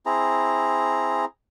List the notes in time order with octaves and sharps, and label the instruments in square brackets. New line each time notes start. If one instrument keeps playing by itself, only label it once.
[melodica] C4 E4 G#4 A#5